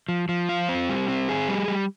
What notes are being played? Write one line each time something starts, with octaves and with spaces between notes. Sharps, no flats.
F3
F3
F4
C4
G3
C4
G#4
G3
G3